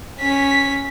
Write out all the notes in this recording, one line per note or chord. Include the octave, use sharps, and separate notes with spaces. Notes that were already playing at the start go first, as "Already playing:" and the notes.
C#4 B6